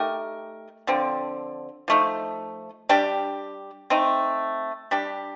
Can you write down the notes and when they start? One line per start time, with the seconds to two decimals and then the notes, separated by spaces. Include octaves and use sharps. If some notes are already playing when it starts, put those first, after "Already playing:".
Already playing: A3 D#4 G4 A#4
0.87 D3 F3 C4
1.88 F3 A3 D#4
2.89 G3 D4 G4
3.90 A3 C4 D#4
4.91 G3 D4 G4